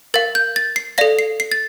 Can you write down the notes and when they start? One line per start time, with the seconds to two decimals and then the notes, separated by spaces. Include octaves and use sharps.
0.14 A#4 F5 A6
0.35 G6
0.56 A6
0.76 C7
0.98 A4 D5 F5 A#6
1.19 C7
1.40 C7
1.52 A6